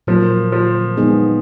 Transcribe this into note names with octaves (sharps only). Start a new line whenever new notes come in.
A#2 F3 F#3 A#3
F3
G#3 B3 D#4 G#4